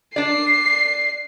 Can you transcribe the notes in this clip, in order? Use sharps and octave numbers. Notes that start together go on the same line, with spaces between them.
D4 D5 C7